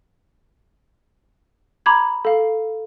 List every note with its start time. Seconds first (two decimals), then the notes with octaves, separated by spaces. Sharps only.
1.86 A#5 B5 D6 G#6
2.25 A4 F5